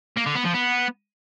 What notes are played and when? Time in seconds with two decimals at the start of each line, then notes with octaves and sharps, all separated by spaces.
0.17 A#3
0.27 D3
0.36 B3
0.46 F3
0.55 B3